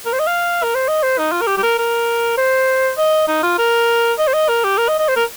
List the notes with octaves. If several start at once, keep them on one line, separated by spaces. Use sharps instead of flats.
A#4
C5
D#5
F5
A#4
C5
D#5
C5
D#4
F4
A#4
G4
G4
A#4
A#4
C5
D#5
D#4
F4
A#4
D#5
C5
D#5
A#4
G4
A#4
D#5
D#5
C5
A#4